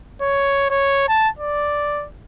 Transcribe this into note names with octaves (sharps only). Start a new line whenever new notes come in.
C#5
C#5
A5
D5